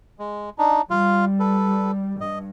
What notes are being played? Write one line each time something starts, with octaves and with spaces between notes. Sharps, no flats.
G#3
D4 D#4
G3 F4 F5
A4 B4
G2 D#5